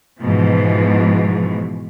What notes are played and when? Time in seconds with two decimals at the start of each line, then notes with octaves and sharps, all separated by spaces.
0.22 G#2 B2 E3 F3